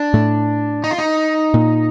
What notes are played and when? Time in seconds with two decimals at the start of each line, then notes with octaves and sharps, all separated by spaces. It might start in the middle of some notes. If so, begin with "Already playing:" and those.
Already playing: D4
0.14 A2 A3
0.84 D#4
0.91 F4
0.98 D#4
1.54 A#2 A#3